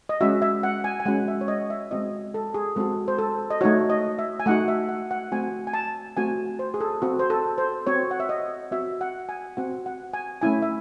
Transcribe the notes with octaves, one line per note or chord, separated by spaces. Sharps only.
D#5
G#3 C#4 F#4 E5
E5
F#5
G#5
G#5
G#3 C#4 F#4 F#5
E5
C#5
D#5
E5
G#3 C4 F#4 D#5
A4
G#4
G#3 C4 F#4 A4
C5
A4
D#5
A3 D#4 F#4 C#5
D#5
E5
G#5
A3 D#4 F#4 F#5
E5
F#5
F#5
A3 C4 F#4 G#5
G#5
A5
A3 C4 F#4 G#5
C5
G#4
A4
C4 F#4
C5
A4
C5
C4 F#4 C#5
F#5
E5
D#5
C4 F#4 E5
F#5
G#5
C4 F#4 F#5
F#5
G#5
A3 C#4 E4 G#5
E5